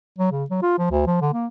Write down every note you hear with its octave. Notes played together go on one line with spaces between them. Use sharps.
F#3
C#3
F#3
F4
F3
D2
F3
D3
A#3